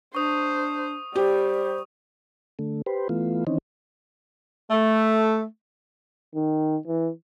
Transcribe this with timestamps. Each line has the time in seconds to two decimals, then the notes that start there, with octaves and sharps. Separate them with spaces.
0.15 D4 C5 C#6 D#6
1.16 G3 G4 C5
2.59 D3 A3
2.86 G4 B4 C5
3.09 E3 A3 B3 F4
3.47 D#3 E3 C4 C#4 D#4
4.70 A3
6.35 D#3
6.87 E3